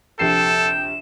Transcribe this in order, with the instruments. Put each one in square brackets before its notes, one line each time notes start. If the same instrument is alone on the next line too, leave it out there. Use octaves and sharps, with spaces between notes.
[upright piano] A#1 C3 C7 [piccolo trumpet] A4 [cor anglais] G5 [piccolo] E7